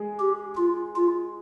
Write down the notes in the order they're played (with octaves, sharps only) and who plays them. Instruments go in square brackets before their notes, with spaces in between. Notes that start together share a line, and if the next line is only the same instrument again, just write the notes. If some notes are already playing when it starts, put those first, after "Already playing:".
Already playing: [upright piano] G#3 G#4
[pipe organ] G4
F4
F4